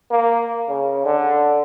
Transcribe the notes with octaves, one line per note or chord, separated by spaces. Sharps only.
A#3
C#3
D3